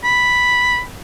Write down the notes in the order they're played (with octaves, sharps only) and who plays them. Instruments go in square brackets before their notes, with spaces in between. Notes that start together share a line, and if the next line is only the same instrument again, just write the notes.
[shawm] B5